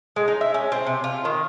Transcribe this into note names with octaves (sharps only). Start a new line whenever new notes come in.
G#3
D#4
E5
C#4
C4
C3
F4
D#3